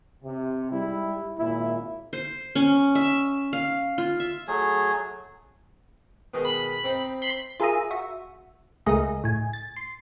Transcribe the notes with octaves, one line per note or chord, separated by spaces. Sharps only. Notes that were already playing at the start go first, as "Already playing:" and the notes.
C3
G#2 G3 E4
G#1 A#2 E4
C5
C#4
E5
F5
F4
E5
F#3 A3 G#4
B2 D#3 G#3
B5
C4 D#4
B5 C6
F4 G#4 A#4 E5 A#5 D#6
F#4 E5
C#2 A3 G#4 A#4 D#5 A#5
A2 G#5
A6
C6